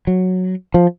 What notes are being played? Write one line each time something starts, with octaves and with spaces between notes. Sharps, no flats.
F#3
F3